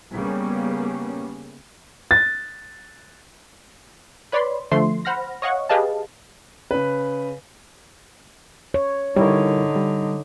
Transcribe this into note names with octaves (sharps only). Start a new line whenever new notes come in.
C#3 G3 A#3 B3 C#4
A6
B4 C#5 D5 B5 C6
D3 F3 A3 C6 C7
C5 F#5 B5 F6 A#6
C#5 D#5 F5 F#5 C#6
G4 G#4 B4 D#5 F5 A5
C#3 B4
C#5
D3 G3 D#4 E4 A#4 C#5
G3